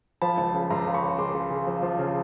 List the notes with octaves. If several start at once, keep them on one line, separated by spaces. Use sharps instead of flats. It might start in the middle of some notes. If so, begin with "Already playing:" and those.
F3 A5 B5
C#2
C#3
C#2 A#5 C6
C#3
B5 C#6
C#3
G#3 C6 D6
C#3
C#3
F3
F3
C#3